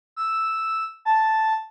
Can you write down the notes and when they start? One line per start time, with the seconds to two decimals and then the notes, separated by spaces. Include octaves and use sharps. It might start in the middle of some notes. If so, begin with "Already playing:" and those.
0.16 E6
1.05 A5